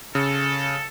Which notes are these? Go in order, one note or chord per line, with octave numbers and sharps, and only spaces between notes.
C#3 A4